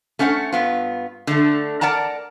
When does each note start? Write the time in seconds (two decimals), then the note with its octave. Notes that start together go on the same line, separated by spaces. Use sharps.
0.19 A3 C#4 C5 F#5
0.52 G2 B3 F4
1.27 D3 A3
1.81 A#4 D5 F#5 A5 A#5